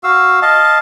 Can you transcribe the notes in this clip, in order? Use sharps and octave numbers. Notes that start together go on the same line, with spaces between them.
F#4 F5 E6
D#5 F5 A5